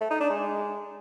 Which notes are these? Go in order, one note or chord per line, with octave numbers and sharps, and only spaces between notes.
A3
D#4
D4
G#3